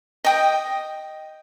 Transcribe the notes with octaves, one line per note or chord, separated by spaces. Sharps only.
D#5 G5 D#6